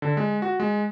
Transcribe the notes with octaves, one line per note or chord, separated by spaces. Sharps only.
D3
G#3
F#4
G#3